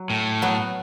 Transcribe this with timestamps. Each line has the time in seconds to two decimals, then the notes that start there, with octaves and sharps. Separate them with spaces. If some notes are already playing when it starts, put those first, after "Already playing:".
Already playing: F#3
0.10 A2
0.42 F#3 B3